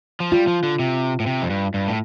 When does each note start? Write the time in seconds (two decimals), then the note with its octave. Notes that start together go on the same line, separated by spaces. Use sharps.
0.20 F3
0.32 G3 F4
0.47 F3
0.63 D3
0.79 C3
1.20 A2
1.26 C3
1.42 F2
1.50 G2
1.74 G2
1.88 A2